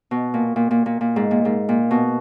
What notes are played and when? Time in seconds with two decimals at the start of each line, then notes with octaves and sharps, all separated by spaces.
0.11 B2
0.34 A#2
0.56 A#2
0.71 A#2
0.86 A#2
1.01 A#2
1.16 G#2
1.31 A#2
1.45 G#2
1.69 A#2
1.91 B2